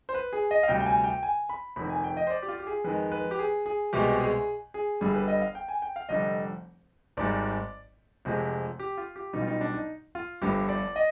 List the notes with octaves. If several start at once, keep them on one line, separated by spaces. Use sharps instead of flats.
C5
B4
G#4
D#5
F5
D2 C3 G3 G5
G5
G#5
G5
G#5
B5
F1 F2 D#3 B5
G#5
G5
D#5
C5
D5
G4
F4
G4
G#4
F2 D#3 G#3 B4
B4
G4
G#4
G#4
C2 B2 G#3 G4
G#4
G#4
G1 G2 D3 G3 G#4
B4
D#5
F5
G5
G#5
G5
F5
F1 F2 D3 G3 D#5
G#1 G#2 G3 D5
F1 F2 C3 F3 G#3
G4
F4
G4
B1 B2 G3 D#4
F4
D#4
D4
D#4
F4
G1 G2 D3 F3 G4
D5
D#5